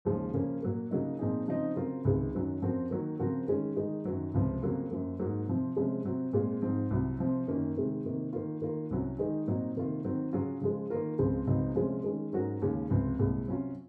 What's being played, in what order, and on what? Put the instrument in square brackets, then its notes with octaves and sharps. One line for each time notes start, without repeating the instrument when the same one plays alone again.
[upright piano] D#2 C#3 F3 G#3 C#4
C#3 F3 A#3 C#4
A#2 F#3 A#3
C#3 F#3 A#3 D#4
A#2 F3 C4 D#4 G#4
C#3 F3 C4 D#4
C#3 F#3 C4 F4 A#4
C#2 C3 D#3 G#3
F#2 D#3 F#3 C#4
F#2 F3 C4 F#4 A#4
D#3 F#3 A#3
C#3 F3 C4 F#4 A#4
D#3 G#3 C#4
D#3 G#3 D#4
F#2 D#3 F#3
C#2 C3 F3
F2 C#3 F#3 A#3 F4
F#2 F3 A#3
G#2 F#3 A#3
C3 F3 C4
C3 F3 G#3 C#4
C3 F#3 C4
A#2 G#3 C4 F4
G#2 F3 C4
C2 C3 F#3
C3 F3 C4
F#2 D#3 A#3 C#4
C3 D#3 G#3
C3 D#3 A#3
D#3 A#3 F4
D#3 A#3 F4 A#4
C2 C3 F#3 C#4
D#3 G#3 D#4 G#4
A#2 F#3 C4 D#4
C3 D#3 A#3 F4
D#3 F#3 C4 F#4
C#3 F#3 C#4 F4 G#4
C#3 F3 G#3
D#3 A#3 F4 A#4
C#2 C#3 F3 G#3 C4
C#2 C#3 F#3 C4 D#4
C3 F3 G#3 C#4
D#3 G#3 C#4
G#2 F#3 C#4 F#4 A#4
D#2 C#3 G#3 C#4
C#2 C3 F3 C4
C2 A#2 G#3
C3 F#3 C#4 F4